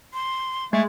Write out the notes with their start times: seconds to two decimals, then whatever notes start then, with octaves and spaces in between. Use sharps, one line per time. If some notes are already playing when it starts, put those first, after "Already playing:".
0.13 C6
0.73 G#3 A3